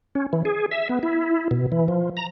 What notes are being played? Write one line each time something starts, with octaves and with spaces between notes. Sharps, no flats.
C#4
E3
G#4
E5
B3
E4
B2
E3
F3
A#5